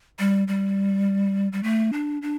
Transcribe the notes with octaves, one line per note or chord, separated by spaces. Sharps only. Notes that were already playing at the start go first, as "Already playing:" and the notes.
G3
G3
G3
A3
D4
D4